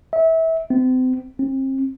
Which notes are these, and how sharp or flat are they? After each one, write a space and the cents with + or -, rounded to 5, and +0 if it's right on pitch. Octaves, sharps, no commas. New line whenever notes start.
E5 -25
C4 -35
C4 +35